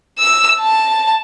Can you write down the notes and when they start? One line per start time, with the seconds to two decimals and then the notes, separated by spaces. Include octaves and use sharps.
0.19 E6
0.60 A5